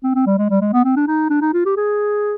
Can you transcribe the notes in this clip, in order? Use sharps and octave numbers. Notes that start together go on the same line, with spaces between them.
C4
C4
G3
G#3
G3
G#3
B3
C4
D4
D#4
D4
D#4
F4
G4
G#4